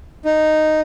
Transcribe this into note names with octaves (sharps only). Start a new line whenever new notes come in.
D#4